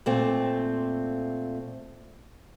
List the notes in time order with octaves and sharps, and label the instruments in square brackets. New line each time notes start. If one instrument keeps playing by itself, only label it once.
[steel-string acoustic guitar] A#2 A3 C4